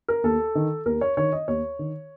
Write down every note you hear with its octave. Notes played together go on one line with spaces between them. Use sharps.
A#4
D#2 A4
D#3
D#2 A#4
C#5
D#3 C#5
D#5
D#2 C#5
D#3